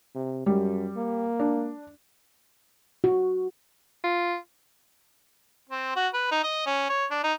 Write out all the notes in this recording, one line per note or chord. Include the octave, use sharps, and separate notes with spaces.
C3
F#2 G3
A#3
D4
F#4
F4
C4
F#4
B4
D#4
D#5
C#4
C#5
D4
D#4